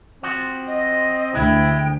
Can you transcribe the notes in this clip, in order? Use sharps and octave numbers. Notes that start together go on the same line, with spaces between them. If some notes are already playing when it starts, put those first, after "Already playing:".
F3 C4 F#4
D#5
D2 G#3 E4 G5